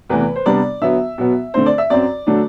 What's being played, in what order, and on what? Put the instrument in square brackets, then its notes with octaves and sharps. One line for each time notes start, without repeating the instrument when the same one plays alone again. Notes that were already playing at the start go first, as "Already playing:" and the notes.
[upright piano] E2 C3 E3 A3 B4
C5
C3 G3 B3 D4 D5
D3 F#3 B3 E5
B2 F#3 B3
D3 A3 C4 C5
D5
E5
F#2 F#3 C4 D5
D3 F#3 A3 D4